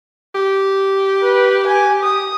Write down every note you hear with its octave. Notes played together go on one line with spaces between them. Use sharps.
G4
B4
G#5
D#6